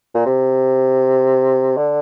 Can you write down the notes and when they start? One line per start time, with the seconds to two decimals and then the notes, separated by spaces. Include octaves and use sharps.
0.15 A#2
0.26 C3
1.77 D3